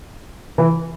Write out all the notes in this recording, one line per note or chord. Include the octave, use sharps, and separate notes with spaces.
E3